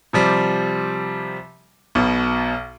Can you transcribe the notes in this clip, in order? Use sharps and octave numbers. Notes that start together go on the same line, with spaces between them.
C3 F3 G3
B1 B2